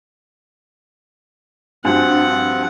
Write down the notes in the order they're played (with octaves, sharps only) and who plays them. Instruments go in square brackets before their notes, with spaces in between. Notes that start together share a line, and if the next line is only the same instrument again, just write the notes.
[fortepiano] G2 [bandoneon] F3 C4 F4 [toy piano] D4 F#4 [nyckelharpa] F#5